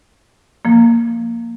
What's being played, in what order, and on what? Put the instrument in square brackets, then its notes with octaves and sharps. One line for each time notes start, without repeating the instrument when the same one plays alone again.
[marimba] F3 A#3